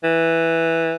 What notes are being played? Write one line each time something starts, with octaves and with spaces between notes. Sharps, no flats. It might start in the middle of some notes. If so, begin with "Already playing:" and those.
E3